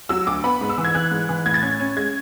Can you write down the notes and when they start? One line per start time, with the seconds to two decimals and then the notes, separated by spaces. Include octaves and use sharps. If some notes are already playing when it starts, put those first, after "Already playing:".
0.09 F#3 E6
0.27 D2 D6
0.44 B3 B5
0.61 G#2
0.69 E6
0.78 E3
0.85 G#6
0.94 E3 F#6
1.11 G#2
1.29 E3
1.46 A2 G#6
1.54 A6
1.63 C#4 G#6
1.80 C#4
1.96 G#3 G#6